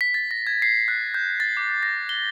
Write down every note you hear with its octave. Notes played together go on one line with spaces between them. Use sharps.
B6
A6
A#6
G#6
C7
F#6
G6
A6
D6
A#6
G7